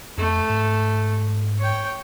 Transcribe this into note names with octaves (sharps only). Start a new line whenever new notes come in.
F2 A3
G#2
C#5 G5